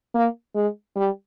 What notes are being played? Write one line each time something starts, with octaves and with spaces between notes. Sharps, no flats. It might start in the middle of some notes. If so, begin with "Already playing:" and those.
A#3
G#3
G3